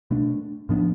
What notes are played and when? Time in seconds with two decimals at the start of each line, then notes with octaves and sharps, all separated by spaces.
0.11 B2 A3 D4
0.69 A2 F3 B3 D4